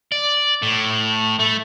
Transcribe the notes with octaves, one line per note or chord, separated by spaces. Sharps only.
D5
A2
A3